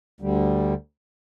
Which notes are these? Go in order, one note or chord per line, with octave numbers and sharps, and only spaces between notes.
D2 D3 G3